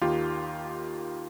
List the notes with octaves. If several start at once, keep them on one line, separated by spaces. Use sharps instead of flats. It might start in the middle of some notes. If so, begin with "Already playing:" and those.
D#2 D#3 F4 G4